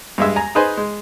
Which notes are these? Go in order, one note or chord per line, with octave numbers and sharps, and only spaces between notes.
G2 G#3 E5
G#5 A#5
D#4 G#4 B4 C5 G#5
G#3